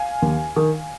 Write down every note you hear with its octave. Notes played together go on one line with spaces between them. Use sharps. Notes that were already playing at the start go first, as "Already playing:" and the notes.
Already playing: F5 G#5
D#2
D#3